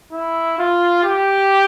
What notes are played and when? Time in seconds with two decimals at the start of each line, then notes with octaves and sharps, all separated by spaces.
0.12 E4
0.58 F4
1.04 G4